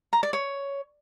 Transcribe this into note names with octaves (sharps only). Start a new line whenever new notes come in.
A#5
D5
C#5